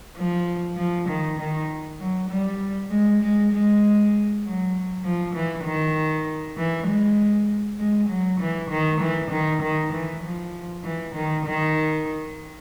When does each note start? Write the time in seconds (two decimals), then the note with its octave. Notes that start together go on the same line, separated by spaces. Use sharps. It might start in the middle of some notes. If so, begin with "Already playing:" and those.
0.16 F3
0.77 F3
1.08 D#3
1.39 D#3
1.99 F#3
2.30 G3
2.90 G#3
3.22 G#3
3.52 G#3
4.44 F#3
5.05 F3
5.35 E3
5.65 D#3
6.57 E3
6.87 G#3
7.79 G#3
8.09 F#3
8.40 E3
8.70 D#3
9.00 E3
9.31 D#3
9.62 D#3
9.92 E3
10.23 F3
10.84 E3
11.15 D#3
11.45 D#3